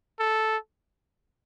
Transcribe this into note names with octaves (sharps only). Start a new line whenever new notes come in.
A4